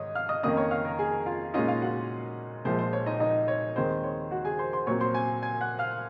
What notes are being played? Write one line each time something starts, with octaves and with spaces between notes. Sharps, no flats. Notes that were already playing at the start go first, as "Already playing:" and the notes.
Already playing: G#2 D#3 C#5 D#5 D#6
F5 F6
D#5 D#6
F2 D#3 A#3 C#4 D#5 D#6
C#5 C#6
F5 F6
A#4 A#5
G#4 G#5
F4 F5
A#2 G#3 C#4 D#4 F4 D#5
F4 F5
F#4 F#5
A#1 A#2 F3 G#3 C5
C5
C#5
D#4 D#5
D#4 D#5
C#5
D#2 D#3 G#3 C4 C5
C#5
F#4 F#5
G#4 G#5
C5 C6
C5 C6
A#2 F#3 C4 C#5 C#6
C5 C6
G#5 G#6
G#5 G#6
F#5 F#6
F5 F6